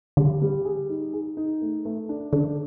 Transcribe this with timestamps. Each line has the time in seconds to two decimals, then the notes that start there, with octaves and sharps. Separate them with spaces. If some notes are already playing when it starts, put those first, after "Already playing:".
0.17 D3 G3
0.42 G3
0.65 G#4
0.89 D#4
1.13 G#4
1.37 D#4
1.62 A3
1.85 A3
2.09 D4
2.33 D3 D4